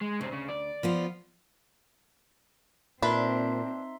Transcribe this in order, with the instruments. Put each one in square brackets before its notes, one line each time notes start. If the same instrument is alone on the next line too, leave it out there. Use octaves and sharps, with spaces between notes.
[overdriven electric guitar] G#3
[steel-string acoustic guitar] D2 [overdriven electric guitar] C#3 C4
[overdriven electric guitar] C#3
D5
[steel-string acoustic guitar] F3 B3 F4
[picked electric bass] A#2 [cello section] C4 [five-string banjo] D4 B4 [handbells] D#4 E5 C6